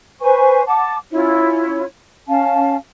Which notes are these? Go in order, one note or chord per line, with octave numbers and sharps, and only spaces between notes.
B4 C5 G#5 C#6
F#5 A5 D6
C#4 E4 F4 C#5
C#4 F5 A5